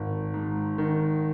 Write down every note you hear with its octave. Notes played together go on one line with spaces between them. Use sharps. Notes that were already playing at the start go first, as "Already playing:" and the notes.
Already playing: G#1 D#3
G#2
D#3